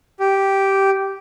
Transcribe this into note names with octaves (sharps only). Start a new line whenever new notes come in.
G4